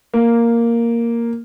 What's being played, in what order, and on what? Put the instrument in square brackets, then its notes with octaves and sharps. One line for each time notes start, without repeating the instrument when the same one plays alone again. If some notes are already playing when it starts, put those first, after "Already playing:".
[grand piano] A#3